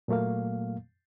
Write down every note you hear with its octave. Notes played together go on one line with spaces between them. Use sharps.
A#2 F#3 A3 A#3 F5